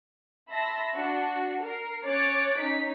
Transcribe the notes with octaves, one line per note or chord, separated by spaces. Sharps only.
E5 A5 B5 C6 A#6
D4 F#4
A#4 C7
C#4 C#5 D6 F#6 A6
C#4 D#4 B6